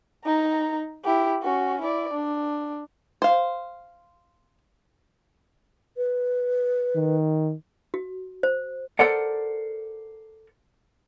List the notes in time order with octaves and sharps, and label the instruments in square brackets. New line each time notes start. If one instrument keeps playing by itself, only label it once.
[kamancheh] D#4 A#5
E4 G4
C#4 F#4
E4 D5
D4
[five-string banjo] C5 F5
[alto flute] B4
[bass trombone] D#3
[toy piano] F#4
C5
[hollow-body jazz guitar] A4 A#4 C5 D5 F#5